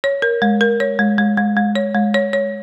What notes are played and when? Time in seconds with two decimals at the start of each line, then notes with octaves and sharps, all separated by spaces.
0.04 C#5
0.22 A#4
0.42 G#3
0.61 A#4
0.80 C#5
0.99 G#3
1.18 G#3
1.37 G#3
1.57 G#3
1.75 C#5
1.95 G#3
2.14 C#5
2.33 C#5